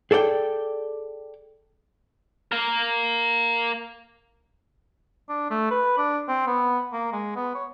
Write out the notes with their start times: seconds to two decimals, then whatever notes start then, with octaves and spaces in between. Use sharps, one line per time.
0.11 G#4 A4 D5 F#5 G5
2.52 A#3 A#4
5.29 D4
5.51 A3
5.71 B4
5.98 D4
6.29 C4
6.47 B3
6.93 A#3
7.13 G#3
7.36 B3
7.55 C#5